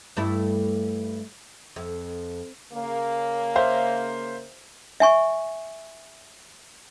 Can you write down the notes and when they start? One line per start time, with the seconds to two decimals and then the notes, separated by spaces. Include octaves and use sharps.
0.17 G2 A3 E4
1.76 F2
2.72 C#3 A#3
3.56 C5 E5 F5
5.00 E5 G#5 C#6